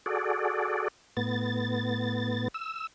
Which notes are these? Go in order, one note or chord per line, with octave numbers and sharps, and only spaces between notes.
F#4 G#4 A4 D5
A2 B3 A6
E6